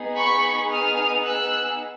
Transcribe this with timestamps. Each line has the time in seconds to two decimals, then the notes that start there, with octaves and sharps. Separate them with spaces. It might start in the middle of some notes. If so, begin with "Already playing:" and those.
Already playing: B3 D#4 G#4
0.16 B5 C#6
0.70 D#6 F6
1.25 E6 F#6